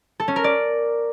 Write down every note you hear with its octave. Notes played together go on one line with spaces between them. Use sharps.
A4
C#4
A#4
D5